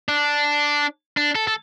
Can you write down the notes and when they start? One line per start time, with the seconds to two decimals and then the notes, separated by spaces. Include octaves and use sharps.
0.09 D4
1.17 D4
1.35 A4
1.47 A4